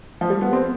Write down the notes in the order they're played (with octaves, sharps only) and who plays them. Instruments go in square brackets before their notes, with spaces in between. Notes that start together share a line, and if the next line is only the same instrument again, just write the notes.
[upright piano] F3
G3
B3
C4